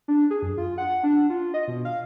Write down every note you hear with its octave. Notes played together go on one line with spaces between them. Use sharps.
D4
G#4
F#2
F4
F#5
D4
F4
D#5
B2
F5